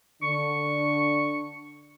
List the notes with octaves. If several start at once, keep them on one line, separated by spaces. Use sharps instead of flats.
D3 D4 C#6